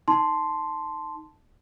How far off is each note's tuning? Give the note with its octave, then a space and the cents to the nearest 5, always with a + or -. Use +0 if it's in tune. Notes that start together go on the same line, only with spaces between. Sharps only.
D#4 +0 A5 +0 C6 -5